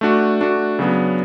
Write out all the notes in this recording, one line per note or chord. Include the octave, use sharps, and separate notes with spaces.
A3 D4 F#4
A3 D4 F#4
C#3 F#3 B3 D4